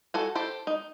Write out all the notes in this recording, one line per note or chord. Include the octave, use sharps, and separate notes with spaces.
F#4 A4 G#5
G4 A4 C5
D#4